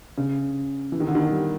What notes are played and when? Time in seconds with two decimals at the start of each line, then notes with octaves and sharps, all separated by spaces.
0.18 C#3
0.92 E3
1.00 D#3
1.07 D3
1.15 D#3
1.31 G3